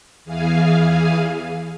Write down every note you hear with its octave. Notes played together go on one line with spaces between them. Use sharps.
E2 E3 G#4 F5 G#5